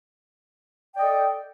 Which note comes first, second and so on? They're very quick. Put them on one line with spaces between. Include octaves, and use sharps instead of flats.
G5 D5 D#5 A4